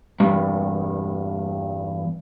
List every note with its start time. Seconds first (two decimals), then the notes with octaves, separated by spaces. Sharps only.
0.20 E2 G2